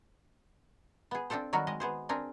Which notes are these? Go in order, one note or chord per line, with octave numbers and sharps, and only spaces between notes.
B3 G#4
C4 D4 F4 A4 C5
D#3 F#3 G3 F#4 A#4
G#3 D#5
B3 G#4 C5
C4 D4 G#4 A#4